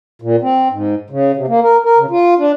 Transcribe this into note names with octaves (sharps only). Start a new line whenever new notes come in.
A#2
C4
G#2
C#3
C3
A#3
A#4
A#4
C#3
F4
D4